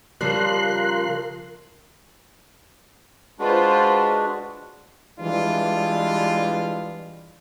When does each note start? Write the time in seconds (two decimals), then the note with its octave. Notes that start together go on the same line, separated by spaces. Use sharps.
0.21 C#3 F3 G3 A#4 C6 F#6
3.39 G#3 D4 F4 F#4 B4 C5
5.20 E3 G3 G#3 D4 F4